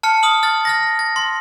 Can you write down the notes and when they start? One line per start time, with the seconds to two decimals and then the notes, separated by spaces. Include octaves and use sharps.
0.03 A5 F6 C#7
0.23 D#6 F6 F#7
0.43 F6 A6
0.65 F6 A6 A#6
0.99 A6
1.16 C6